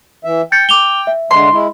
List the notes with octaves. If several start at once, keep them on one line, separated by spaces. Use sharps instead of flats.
E3 E5
G5 G6 A6 C#7
D6 F7 G7
E5
D3 G#3 C6
G#3 E4